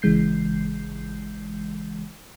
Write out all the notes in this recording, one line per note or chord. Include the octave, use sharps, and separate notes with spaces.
G#1 C#3 E3 G#3 G6 C7